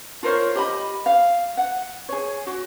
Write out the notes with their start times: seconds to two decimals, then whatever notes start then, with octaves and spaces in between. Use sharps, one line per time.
0.23 F4 A#4 C5 C#5
0.55 G4 D#5 B5
1.06 F5
1.57 F#5
2.09 G#4 C#5
2.47 F#4